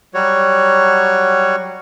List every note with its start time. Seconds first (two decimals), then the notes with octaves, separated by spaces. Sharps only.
0.14 F#3 G3 F#4 C#5